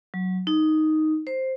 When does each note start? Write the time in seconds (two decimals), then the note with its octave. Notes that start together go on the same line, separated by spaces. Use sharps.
0.14 F#3
0.47 D#4
1.27 C5